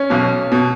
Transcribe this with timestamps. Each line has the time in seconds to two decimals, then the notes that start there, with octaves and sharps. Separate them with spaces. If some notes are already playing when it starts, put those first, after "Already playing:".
Already playing: C#4
0.10 B1 B2
0.52 B2